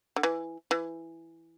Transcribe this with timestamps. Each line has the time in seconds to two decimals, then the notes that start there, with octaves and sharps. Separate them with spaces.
0.16 D3
0.23 E3
0.71 E3